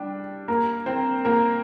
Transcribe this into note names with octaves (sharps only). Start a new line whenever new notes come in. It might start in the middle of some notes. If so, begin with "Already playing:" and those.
Already playing: G3 D4
A#3 A#4
C4 C5
A#3 A#4